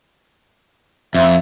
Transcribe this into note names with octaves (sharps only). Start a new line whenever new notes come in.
F2 E5